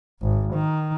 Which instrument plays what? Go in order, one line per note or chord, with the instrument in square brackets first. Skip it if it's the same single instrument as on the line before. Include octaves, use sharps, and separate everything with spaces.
[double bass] G#1
D#3